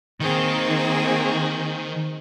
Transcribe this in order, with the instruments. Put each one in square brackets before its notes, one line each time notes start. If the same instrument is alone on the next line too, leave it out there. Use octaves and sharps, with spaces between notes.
[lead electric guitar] D#3 [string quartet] A#3 C4 G#4